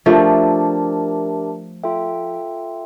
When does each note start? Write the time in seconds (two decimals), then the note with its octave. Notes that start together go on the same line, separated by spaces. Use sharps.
0.06 F3 A3 D4 G4 A#4 E5 A5
1.83 F4 A4 E5 G5